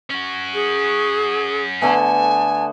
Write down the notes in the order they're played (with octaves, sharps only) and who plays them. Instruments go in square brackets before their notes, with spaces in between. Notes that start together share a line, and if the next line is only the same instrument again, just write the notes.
[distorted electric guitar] C#4 F#4
[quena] G#4
[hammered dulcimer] D3 A3 B3 [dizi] G#5 [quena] A5